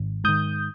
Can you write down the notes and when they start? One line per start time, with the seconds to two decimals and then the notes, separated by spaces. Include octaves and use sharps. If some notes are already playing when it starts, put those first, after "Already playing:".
Already playing: G#1
0.24 G#2 D#3 D#6 G6